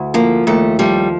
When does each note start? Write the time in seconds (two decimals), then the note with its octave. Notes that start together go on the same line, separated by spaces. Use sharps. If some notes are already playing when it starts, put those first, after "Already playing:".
Already playing: D2
0.14 F3 A#3
0.47 D#2 A3
0.79 F3 G3